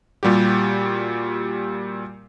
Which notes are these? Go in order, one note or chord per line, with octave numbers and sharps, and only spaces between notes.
A#2 G3 F#4 G4